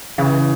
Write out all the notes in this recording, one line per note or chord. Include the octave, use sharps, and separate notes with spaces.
C#3 E3